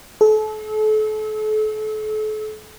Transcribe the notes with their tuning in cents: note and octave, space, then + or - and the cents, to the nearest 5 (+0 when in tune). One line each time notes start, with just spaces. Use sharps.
A4 -35